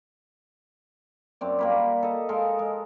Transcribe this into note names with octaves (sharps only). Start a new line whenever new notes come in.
F#2 C4 D5
G3 A#3 B5
A4 D#5
G#3 A4 A#4 F5
G#3